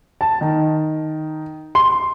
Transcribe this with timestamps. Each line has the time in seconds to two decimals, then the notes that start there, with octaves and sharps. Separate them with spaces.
0.21 A5
0.41 D#3
1.75 C6